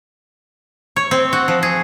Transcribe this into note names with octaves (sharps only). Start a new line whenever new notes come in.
C#5
C4
F#4
F3
G#4